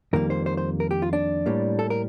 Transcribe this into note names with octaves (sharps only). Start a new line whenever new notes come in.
F2 D#3 G3 A#3 A#4
C5
C5
C5
A#4
G4
F4
D4
A2 G3 A#3
A4
A#4